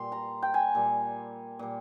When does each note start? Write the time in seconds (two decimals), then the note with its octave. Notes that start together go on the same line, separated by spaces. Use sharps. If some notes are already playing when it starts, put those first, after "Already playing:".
Already playing: A#2 G3 C6
0.12 A#5
0.42 G5
0.54 G#5
0.75 A#2 G3
1.59 A#2 G3